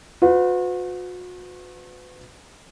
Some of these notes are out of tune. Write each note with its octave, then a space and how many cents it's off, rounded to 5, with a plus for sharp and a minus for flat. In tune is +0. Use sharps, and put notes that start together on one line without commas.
F#4 -40 B4 +35